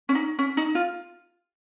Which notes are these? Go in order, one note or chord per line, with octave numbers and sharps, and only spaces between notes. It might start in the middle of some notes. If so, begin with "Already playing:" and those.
C#4
D#4
C#4
D#4
F4